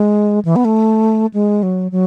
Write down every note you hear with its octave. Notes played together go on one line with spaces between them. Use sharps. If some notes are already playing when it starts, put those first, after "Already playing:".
Already playing: G#3
E3
B3
A3
G#3
F#3
F#3